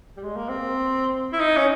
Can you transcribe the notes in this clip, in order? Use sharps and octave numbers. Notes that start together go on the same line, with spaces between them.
G3
G#3
A#3
C4
E4
D#4
C#4